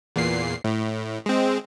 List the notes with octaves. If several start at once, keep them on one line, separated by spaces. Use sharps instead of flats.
E2 A#2 C7
A2
G#3 C4